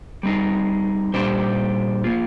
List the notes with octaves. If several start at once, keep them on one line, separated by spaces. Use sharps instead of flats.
G3 C4 D#4 G#4
A#2 G3 D4 G4 C5
F3 A#3 F4 G#4